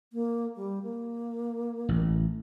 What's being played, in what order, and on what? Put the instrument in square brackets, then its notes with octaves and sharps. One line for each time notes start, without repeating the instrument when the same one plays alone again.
[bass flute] A#3
G3
A#3
[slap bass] A1